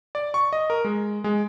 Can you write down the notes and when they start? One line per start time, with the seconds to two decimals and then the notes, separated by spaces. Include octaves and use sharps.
0.15 D5
0.34 C#6
0.53 D#5
0.70 A#4
0.84 G#3
1.24 G#3